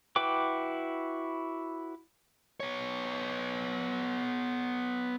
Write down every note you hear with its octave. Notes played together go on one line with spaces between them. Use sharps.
E4 F#4 B4 G5 D6
B3 C#5